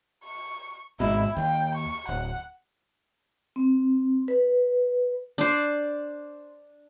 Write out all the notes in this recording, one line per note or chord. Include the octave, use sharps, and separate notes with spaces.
C#6
G#1 G#2 B2 E4
D#2 G5
C#6
D1 F#5
C4
B4
D4 C5